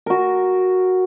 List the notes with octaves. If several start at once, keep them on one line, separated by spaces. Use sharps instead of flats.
F#4 A#4